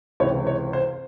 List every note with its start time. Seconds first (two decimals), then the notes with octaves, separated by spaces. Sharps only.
0.20 C#2 C3 E3 C#5
0.47 C#5
0.73 C5